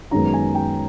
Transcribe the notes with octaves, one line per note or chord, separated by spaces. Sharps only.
F#2 D#3 G#3 B3 A#5
G#5
G5